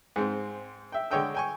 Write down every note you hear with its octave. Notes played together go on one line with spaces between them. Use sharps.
G#2 G#3 C4
E5 G5
D3 G#3 C#5 D#5 G5 E6
G5 G#5 C#6